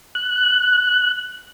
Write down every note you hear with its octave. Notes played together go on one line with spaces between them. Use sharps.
F#6